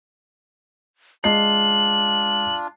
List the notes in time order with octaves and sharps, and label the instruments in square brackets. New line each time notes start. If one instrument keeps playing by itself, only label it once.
[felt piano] G#3 D#5 C7 [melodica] D4 F4 [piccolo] F#7